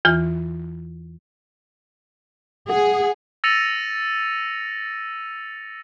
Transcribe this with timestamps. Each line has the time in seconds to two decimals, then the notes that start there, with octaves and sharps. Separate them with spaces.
0.05 E2 E3 F4 F6
2.68 G#4 F#5
3.44 E6 A6 A#6 C#7 D#7 F7